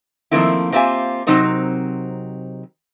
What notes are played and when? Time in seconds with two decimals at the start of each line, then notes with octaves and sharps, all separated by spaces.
0.31 D#3 F3 A3 A#3 C4 E4
0.72 A#3 C4 F4 G4 E5 G#5
1.27 C3 F#3 C4 D#4 A#4